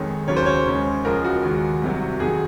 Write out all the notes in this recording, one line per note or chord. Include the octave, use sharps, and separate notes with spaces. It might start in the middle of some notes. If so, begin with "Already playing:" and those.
Already playing: F2 D#3 G#3 C#5
D#2 C#3 F#3 C#5
C5
C#5
D#2 C#3 G#3
C#2 C#3 F3 G#3 A#4
F#4
D#2 D#3 G#3
C2 C3 F#3
F2 D#3 F#3 G#4